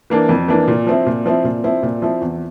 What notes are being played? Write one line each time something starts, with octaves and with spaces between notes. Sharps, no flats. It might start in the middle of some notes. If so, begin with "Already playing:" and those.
E3 A#3 D4
F2
E3 A#3 D4
A#2
F3 C4 E4
A#2
F3 C4 E4
A#2
F3 C4 E4
A#2
F3 C4 E4
E2